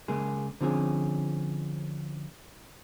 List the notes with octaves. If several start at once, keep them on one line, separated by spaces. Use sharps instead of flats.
C#3 G#3 A#3 G#4
D3 F3 C4 C#4 G#4